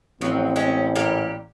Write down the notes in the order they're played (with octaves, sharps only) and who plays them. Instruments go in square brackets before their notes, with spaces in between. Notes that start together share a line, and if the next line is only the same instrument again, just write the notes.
[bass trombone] A1 [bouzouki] F3 F#3 [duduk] C4
[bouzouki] G#3 C#4
A#2 G3 G4